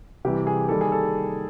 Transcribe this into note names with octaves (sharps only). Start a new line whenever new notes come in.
C3 E3 G3 G4
G#4
D#3 G3 A#3 A4
G#4
A4